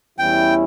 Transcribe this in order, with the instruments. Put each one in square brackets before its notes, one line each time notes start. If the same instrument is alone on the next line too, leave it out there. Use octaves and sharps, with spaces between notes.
[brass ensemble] E2 E3 G3 C#4 E4 [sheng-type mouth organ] G5